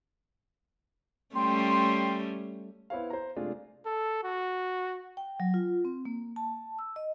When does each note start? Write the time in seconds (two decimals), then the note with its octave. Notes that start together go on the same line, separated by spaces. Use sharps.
1.35 G3 A3 C#4 G5 C6
2.90 B3 E4 C5 C#5 F5
3.10 C5 A#5
3.36 C3 G#3 A3 D4 F4 G#4
3.86 A4
4.24 F#4
5.17 G5
5.40 F#3
5.54 F4
5.85 C4
6.05 A#3
6.36 A5
6.79 E6
6.96 D#5